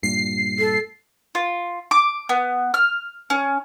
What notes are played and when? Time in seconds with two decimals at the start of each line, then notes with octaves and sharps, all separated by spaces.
0.03 G2 A#2 C7
0.59 A4
1.35 F4
1.91 D6
2.29 B3
2.74 F6
3.30 C#4